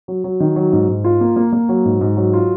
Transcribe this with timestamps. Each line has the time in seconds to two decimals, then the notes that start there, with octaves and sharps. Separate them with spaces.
0.08 F#3
0.24 F#3
0.40 D#3
0.56 F#3
0.73 G#2
0.88 G#2
1.04 F4
1.21 A#3
1.36 A#3
1.53 A#3
1.69 F#3
1.85 G#2
2.01 G#2
2.17 F#3
2.33 F4